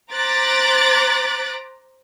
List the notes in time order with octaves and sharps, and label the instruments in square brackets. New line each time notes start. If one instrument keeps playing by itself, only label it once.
[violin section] C5 A#5 D6 F#6 A6 B6